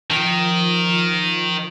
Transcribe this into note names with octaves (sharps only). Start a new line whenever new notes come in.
D#3 F3